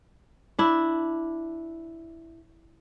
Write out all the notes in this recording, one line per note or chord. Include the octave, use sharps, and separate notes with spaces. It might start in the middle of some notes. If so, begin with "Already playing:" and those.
D4 E4